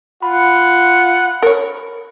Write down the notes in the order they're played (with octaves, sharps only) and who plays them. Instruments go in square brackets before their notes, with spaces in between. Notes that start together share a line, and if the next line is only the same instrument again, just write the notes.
[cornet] F4 [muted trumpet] F#5 [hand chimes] B5
[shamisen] A#4 C#5